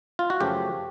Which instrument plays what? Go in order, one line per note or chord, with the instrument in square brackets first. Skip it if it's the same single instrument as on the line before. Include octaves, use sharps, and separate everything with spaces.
[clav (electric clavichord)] F4
F#4
F#2 C#3 F3 A3 G4